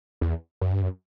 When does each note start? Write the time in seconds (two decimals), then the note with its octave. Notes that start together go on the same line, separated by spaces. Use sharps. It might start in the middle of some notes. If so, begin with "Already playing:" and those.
0.21 E2
0.61 F#2
0.72 G2
0.82 F#2